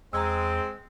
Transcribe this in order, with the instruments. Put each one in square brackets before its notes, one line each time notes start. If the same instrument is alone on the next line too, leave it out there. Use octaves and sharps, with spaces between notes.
[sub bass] E2 [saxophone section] G#3 [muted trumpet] C4 [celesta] A#5 E6